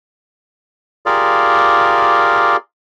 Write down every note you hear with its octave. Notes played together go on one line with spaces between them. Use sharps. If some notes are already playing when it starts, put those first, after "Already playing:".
F4 G4 G#4 A#4 D5 F5